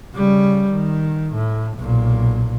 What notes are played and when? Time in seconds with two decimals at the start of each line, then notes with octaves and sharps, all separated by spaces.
0.16 C#3 G3
0.71 D#3
1.33 A2
1.77 B1 A#2